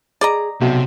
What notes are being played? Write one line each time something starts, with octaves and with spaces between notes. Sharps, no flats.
G#4 D5 D#5 A#5
B1 C3 E5